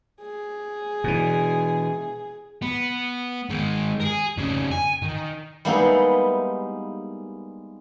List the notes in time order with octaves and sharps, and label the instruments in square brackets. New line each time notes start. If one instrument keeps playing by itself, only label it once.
[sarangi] G#4
[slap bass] B2 E3
[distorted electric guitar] B3
D#3 G#3
G#4 A#4
F2 C#3
G#5
D#3
[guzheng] G3 G#3 A#3 B3 D#4 E4